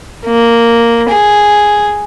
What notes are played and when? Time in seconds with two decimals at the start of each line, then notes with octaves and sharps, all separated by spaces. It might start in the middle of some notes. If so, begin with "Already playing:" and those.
0.26 A#3
1.09 G#4